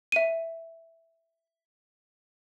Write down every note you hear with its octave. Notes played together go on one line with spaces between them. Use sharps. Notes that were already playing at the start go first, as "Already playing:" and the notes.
E5 D#7